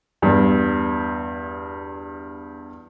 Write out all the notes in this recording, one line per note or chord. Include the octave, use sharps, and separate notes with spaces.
E2 G2